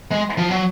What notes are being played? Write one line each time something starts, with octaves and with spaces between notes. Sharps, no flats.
G#3
F3
F#3